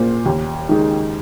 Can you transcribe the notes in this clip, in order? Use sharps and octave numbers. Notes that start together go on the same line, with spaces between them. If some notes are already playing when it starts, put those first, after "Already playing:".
Already playing: A#2 A#3 F4 C5
D#2
D#3 G#3 D#4